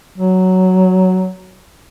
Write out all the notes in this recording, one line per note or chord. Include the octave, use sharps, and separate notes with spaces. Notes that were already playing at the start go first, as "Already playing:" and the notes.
F#3